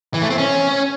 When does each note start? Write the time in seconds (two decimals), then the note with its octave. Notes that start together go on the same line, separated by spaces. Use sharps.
0.14 E3
0.22 A3
0.30 C4
0.38 C#4